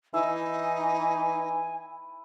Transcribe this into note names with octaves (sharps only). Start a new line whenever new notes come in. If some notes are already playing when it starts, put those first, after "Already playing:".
E3 D#4 E4 E5 G#5